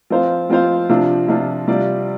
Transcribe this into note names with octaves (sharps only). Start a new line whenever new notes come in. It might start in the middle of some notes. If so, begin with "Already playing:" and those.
F3 C4 F4 C5 F5
F3 C4 F4 C5 F5
C3 F3 D4 F4
C3 F3 D4 F4
C3 G3 F4 D5